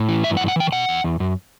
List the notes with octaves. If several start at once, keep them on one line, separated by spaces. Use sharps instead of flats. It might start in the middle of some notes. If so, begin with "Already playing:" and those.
Already playing: A2
E3
G2 E5
F#5
G2
F#5
E3 G5
B2 F#5
E2
E2
F#2